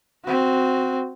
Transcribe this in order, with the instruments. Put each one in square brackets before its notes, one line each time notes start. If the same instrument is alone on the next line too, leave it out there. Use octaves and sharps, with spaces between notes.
[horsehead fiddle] C4 F#4